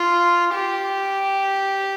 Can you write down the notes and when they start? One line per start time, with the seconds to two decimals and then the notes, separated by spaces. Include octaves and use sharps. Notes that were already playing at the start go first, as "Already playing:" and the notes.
Already playing: F4
0.54 G4